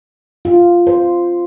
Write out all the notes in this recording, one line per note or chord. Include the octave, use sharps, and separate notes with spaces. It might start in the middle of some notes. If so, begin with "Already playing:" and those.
F4
C5